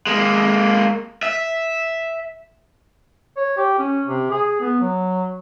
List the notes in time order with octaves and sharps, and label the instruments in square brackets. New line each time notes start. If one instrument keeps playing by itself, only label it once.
[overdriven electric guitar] G#3 A#3
E5
[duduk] C#5
G4
C#4
C3
G#4
B3
F#3